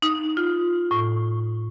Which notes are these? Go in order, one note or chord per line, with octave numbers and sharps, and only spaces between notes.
D#4
F4
A2